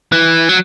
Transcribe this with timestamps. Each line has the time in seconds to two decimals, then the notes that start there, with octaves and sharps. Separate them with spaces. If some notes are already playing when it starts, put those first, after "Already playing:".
0.12 E3
0.49 F#3